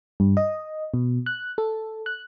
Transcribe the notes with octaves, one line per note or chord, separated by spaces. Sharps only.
G2
D#5
B2
F#6
A4
F#6